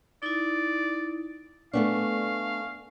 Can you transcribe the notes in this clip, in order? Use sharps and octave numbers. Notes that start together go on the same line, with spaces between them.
D#4 E4 D5
A3 B3 D4 F5 G#5 C#6